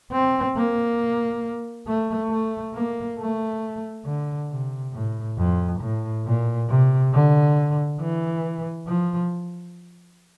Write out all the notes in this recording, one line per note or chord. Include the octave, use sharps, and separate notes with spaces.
C4
A#3
A3
A3
A#3
A3
D3
C3
A2
F2
A2
A#2
C3
D3
E3
F3